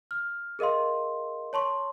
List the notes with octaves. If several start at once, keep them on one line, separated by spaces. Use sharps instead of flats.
F6
G#4 A#4 D#5 F5 C6
C#5 A5 C6 C#6